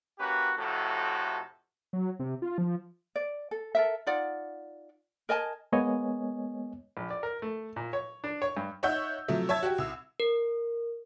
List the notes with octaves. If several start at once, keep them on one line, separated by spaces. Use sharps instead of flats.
A#3 C#4 F#4 G4 B4
F2 A2 C3 F#4 A4
F#3
C3
F4
F3
D5
A4
A4 A#4 E5
D#4 F4 D5 F#5
A#4 D#5 G#5 A5
G#3 A#3 B3 C#5 D#5 G#5
A#1
D5
A#4
A3
A#2
C#5
D4
C#5
G2
D#4 C#5 E5 F#5 E6 G6
C3 F3 F#3 A3
C#5 E5 A5 G#6
F#4 G4
C2 E6
A#4